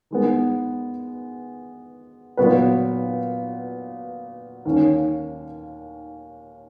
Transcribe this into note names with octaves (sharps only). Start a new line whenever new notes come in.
D#3 G#3 B3
A#2 F#3 B3 F#4 B4
D#2 D#3 A#3 C#4